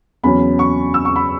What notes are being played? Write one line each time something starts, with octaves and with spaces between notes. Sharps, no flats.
E2 C#3 F#3 C#4 B5
C#6
E6
C#6
B5